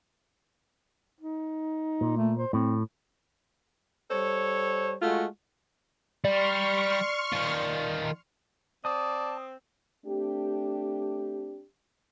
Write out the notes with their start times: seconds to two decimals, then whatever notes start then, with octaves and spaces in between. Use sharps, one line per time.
1.20 D#4
2.01 A#2
2.17 A3
2.39 C5
2.53 A2 C4
4.11 G3 A4 C5 C#5
5.02 G#3 A3 F4 F#4
6.25 G3 D5 C6 C#6 F6
7.33 D#3 F4
8.85 C4 D5 A5 D#6
10.05 A3 C4 D4 G4